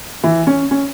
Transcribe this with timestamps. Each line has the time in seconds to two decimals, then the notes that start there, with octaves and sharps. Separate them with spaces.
0.24 E3
0.47 C#4
0.71 C#4